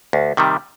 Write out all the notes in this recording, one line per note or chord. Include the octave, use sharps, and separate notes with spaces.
D2
C3 D#3 G3